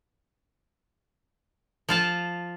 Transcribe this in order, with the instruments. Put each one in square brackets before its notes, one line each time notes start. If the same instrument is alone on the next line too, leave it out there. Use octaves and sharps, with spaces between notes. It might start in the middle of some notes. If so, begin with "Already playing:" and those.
[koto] F3 F4 A5